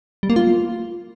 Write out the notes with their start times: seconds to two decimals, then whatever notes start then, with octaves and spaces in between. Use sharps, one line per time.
0.23 G3
0.30 A#3
0.36 F4